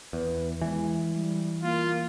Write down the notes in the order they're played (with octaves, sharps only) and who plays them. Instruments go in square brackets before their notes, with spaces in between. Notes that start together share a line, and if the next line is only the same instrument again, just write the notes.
[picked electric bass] E2 [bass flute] B4
[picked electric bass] E3 [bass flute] G#3
[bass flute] G3
[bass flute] A#3 [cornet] F4